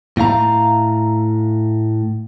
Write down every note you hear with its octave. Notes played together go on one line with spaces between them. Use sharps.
A2 A3 F5 A#5